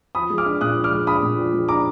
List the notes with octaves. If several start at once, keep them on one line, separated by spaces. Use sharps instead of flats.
F3 B5 D#6
G#3
D6 F6
D4
A#2 D#6 F#6
F3
D6 F6
G#3
D4 B5 D#6
A#2
F3
G#3
D4 A#5 D6